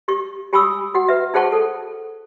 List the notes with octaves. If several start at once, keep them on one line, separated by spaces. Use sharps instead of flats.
G4 C#6
G4 G#5 B5 C#6 D#6 E6
F#4 F#5
B4 E5
D#4 G#4 C5 F#5 A5 C#6
A4